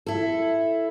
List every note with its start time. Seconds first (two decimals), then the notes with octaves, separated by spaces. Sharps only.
0.06 E4 A4